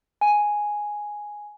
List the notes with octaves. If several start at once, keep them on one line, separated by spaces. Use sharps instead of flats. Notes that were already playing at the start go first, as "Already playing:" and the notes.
G#5